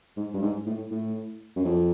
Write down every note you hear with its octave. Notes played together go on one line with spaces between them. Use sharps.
G#2
G2
G#2
A2
A2
F#2
F2